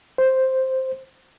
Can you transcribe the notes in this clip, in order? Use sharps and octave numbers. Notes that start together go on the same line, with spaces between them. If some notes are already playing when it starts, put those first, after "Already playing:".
C5